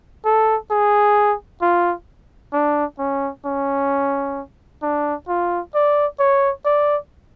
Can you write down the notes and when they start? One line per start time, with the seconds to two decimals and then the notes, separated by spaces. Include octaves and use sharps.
0.25 A4
0.71 G#4
1.62 F4
2.53 D4
2.98 C#4
3.45 C#4
4.82 D4
5.28 F4
5.74 D5
6.19 C#5
6.65 D5